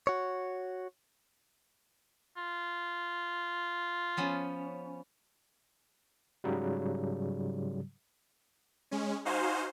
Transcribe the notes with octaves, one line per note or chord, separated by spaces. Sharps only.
F#4 C#5
F4
F3 B3 C#4
G#2 C#3 F#3 G3
G#3 C#4
D#4 F#4 C5 F5 G#5